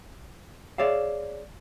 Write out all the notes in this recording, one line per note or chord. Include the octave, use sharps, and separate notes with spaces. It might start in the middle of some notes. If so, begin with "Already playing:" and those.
G#4 C#5 D5 E5 F5